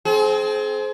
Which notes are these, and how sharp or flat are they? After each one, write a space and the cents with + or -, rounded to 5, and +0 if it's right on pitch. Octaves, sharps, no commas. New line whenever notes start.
C4 +0 G#4 +35